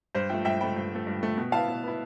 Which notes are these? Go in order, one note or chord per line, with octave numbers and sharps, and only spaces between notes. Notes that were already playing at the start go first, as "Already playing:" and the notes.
G2 C5
F3 A3 E5 G5
G2 E5 G5
F3 A3 G5 B5
G2
F3 A3
G2
F3 A3
B2
B3 E4 F5 A5
B2
B3 E4